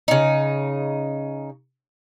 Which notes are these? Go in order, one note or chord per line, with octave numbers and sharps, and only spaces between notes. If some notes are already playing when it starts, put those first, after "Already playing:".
C#3 D#4